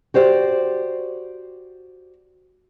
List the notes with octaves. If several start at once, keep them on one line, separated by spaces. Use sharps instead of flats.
F#4 G4 C5 D5